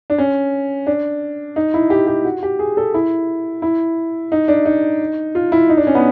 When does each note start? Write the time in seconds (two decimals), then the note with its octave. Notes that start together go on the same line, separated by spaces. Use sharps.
0.10 D4
0.18 C#4
0.87 D4
1.56 D#4
1.74 E4
1.90 G4
2.07 G4
2.25 F#4
2.43 G4
2.59 G#4
2.77 A4
2.94 E4
3.62 E4
4.32 D#4
4.48 D4
4.66 D#4
5.35 F4
5.52 E4
5.69 D#4
5.77 D4
5.87 C#4
5.95 B3